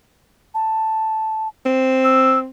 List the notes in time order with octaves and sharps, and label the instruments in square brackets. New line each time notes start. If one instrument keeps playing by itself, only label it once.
[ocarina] A5
[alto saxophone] C4
[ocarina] E6